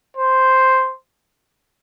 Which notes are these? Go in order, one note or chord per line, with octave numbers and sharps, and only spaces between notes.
C5